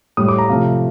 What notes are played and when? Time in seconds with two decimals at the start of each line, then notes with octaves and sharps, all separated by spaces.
0.17 A2 G3 D#6
0.28 D6
0.38 A#5
0.49 C3 F3 A3 F5